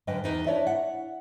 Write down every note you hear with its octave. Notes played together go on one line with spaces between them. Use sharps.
F#2 D3 A#4 B4 D#5 G5
E2 D#4 A#4 B4
D4 E4 C#5 D5 E5
F#5